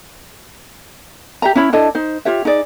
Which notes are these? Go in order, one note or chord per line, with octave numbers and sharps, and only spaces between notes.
G4 E5 A#5
C#4 E4 C#5 B5
D4 E4 A4 D#5
D#4 C5
F4 G4 C#5 E5
D#4 G#4 D5